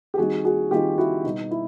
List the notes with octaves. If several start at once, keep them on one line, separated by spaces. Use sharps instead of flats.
G4
D#3 G3 C4 D#4 F#4 G#4
F#4 G#4
D#3 G3 C4 D#4 F4 G4
E4 F#4
B2 G3 B3 D#4
E4